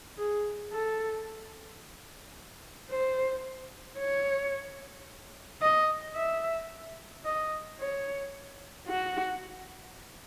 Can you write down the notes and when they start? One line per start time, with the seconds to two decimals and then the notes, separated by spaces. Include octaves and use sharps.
0.18 G#4
0.72 A4
2.90 C5
3.99 C#5
5.62 D#5
6.16 E5
7.25 D#5
7.79 C#5
8.88 F#4